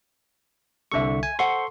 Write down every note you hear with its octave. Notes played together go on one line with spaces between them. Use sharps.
C2 D3 A4 E5 C#6
G#5
A4 C5 F#5 C6 C#6